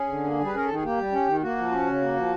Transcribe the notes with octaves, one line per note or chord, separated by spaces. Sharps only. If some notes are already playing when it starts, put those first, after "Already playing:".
Already playing: C#4 G#4
D3
A#3
G3
B4
C#4 A#4
D#3 A4
G#4
A#3 G4
G3
C#4
D#3
A#3 F#4
F3
C#4
C#3
A#3
F3